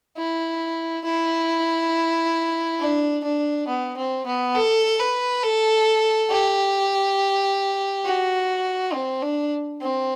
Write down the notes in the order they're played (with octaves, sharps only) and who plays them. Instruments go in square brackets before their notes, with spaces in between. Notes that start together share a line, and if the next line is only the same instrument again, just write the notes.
[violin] E4
E4
D4
D4
B3
C4
B3
A4
B4
A4
G4
F#4
C4
D4
C4